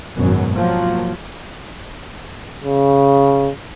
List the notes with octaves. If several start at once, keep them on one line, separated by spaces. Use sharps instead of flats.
G#1 F#2 B2 F#3
F3 F#3 A#3
C#3